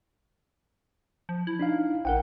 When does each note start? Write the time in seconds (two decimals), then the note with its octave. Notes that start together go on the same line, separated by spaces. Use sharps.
1.29 F3
1.47 E4
1.59 D4 D#4 F5
2.05 A#1 A#4 F#5 G5